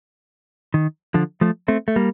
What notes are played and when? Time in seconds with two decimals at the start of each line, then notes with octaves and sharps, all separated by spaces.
0.74 D#3
1.14 D3 F3
1.41 F3 A3
1.68 A3 C4
1.88 A3
1.96 G3 A#3